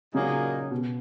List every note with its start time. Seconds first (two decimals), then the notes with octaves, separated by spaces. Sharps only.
0.14 A#2 C#3 F#3 A#3 D#4 G#4
0.71 B2